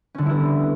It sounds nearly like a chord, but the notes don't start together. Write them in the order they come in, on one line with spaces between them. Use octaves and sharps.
C#4 D3 G3 E4 B3